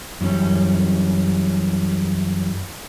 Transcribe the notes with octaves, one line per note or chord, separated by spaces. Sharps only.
F#2 E3 G3 C#4